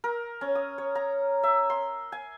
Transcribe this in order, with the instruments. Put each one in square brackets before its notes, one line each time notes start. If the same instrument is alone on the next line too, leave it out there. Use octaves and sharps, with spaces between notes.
[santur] A#4
C#4
D#6
C#5
A#5
E5
C6
G#5